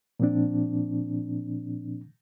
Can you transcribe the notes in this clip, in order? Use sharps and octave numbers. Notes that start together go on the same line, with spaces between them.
A#2 F3 C4 D4